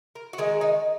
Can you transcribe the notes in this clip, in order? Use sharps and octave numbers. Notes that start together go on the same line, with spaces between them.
A#4
F#4
D#3 G#3 G#4
D#4